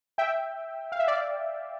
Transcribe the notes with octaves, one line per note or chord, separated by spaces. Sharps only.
E5 G5
F5
E5
D5 F5